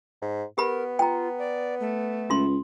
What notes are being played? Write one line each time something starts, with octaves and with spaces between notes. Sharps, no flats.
G#2
B3 G4 A#4 B5
F4 G5 A#5
D5
A3
C#2 F4 C6